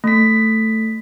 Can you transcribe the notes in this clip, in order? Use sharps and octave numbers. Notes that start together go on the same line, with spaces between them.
A3 B6